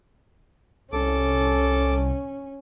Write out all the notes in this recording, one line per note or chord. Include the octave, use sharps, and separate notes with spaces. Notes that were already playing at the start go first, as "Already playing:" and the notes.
C2 C#4 A4 D6